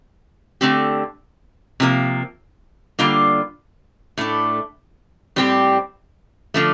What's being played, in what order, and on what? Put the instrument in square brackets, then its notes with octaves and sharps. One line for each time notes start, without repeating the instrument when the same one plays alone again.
[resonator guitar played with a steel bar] D3 A3 C4 G4
C3 F3 A#3
D3 G3 A#3 F4
A2 A3 D4
A2 G3 C4 G4
D3 F3 A3